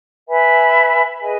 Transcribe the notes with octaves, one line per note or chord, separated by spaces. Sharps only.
B4 E5 G#5 B5
G#4 B4 D#5 G#5